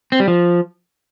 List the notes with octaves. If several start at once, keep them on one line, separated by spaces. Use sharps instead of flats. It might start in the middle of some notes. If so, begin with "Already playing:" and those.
C4
G3
F3